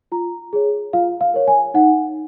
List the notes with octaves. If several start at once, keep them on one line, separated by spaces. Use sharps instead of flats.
F4 A#5
G#4 C#5
F4 F5
F5
A#4 C#5
G#5
D#4 F#5